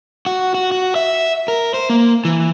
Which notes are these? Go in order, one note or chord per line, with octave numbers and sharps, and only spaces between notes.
F#4
F#4
F#4
E5
A#4
C5
A#3
E3